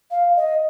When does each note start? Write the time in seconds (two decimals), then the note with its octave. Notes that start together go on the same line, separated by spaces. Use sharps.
0.11 F5
0.36 D#5